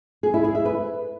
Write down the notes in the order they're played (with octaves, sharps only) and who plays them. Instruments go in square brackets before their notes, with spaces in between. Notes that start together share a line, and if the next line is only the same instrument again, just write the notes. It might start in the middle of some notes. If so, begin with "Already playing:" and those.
[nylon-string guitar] G#4
E4
G#4
E5
B4